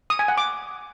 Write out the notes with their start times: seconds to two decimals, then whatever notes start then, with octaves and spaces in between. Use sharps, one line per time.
0.10 D#6
0.19 G#5
0.28 F#5
0.38 D6